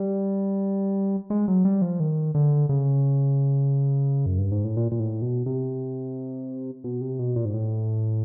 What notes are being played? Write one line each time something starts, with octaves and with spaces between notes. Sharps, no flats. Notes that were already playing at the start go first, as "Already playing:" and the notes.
Already playing: G3
G#3
F#3
G3
F3
D#3
D3
C#3
F#2
G2
G#2
A2
A#2
A#2
A2
B2
C3
B2
C3
B2
A#2
G#2
A2